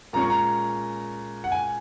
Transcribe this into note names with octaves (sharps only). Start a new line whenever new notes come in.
A#2 G#3 C#4 A#5
C#6
A#5
F#5
G#5